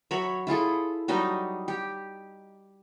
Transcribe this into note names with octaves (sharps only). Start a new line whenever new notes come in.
F#3 C#5 E5 B5
E4 F4 G#4 A4
F#3 G3 D#4 D#5
G4